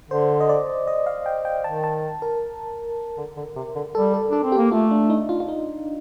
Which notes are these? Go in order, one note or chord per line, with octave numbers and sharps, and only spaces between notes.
D3 C5
D#5
D5
D#5
F5
G5
G5
D#3 A5
A5
A#4
D3
D3
C3
D3
G3 A4
A4
D4 A4
C4
G4
A#3
A3 F4
D4
D#4
F4
F4
D#4